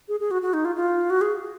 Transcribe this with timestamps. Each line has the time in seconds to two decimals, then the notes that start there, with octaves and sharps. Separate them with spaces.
0.08 G#4
0.20 G#4
0.31 F#4
0.42 F#4
0.53 D#4
0.65 F4
0.76 F4
1.10 F#4
1.21 G#4